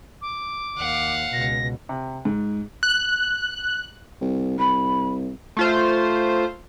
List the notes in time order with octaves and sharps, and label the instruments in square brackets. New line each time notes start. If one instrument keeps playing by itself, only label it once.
[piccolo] D6
[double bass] D#2 [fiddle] F5 F#5
[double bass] C#2 B2 [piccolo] A#6
[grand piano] C3
G#2
[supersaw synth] F#6
[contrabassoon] C2
[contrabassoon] C2 [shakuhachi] B5
[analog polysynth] A3 F4 C5